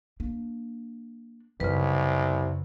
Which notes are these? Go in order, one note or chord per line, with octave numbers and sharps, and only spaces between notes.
A#3 D4
C2 F#2 C#3 D#4 B4